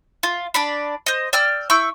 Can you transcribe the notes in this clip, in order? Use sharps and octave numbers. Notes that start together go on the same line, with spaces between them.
F4
D4 D5 B5
C5 D#5
D5 G5 E6 F6
E4 C#6 E6 G6